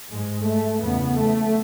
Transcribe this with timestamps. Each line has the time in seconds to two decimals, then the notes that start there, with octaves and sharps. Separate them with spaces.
0.11 G#2 G#3
0.46 A3
0.81 E2 C#3 B3
1.17 A3